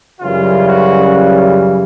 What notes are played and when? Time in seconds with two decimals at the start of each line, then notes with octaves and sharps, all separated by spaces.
0.20 F#2 C#3 E3 G3 F4
0.68 F#4
1.15 F4